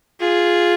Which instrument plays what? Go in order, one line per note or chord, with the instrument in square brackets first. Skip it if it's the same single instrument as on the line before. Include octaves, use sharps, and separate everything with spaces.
[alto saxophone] F4 [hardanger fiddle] G#4